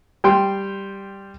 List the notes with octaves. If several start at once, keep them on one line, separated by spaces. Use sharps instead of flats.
G3 G5 C6